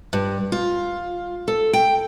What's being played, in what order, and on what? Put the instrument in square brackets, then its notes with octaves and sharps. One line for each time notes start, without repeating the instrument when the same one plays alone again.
[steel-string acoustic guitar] G2
F4
A4
G5